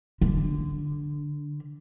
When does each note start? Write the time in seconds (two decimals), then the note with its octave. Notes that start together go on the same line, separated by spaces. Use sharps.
0.21 D3